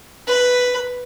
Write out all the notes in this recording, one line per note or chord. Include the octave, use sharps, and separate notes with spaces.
B4